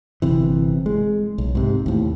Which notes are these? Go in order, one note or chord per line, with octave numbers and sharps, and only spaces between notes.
G1 C3 E3
G#3
B1
G#2 C3
D#2 A2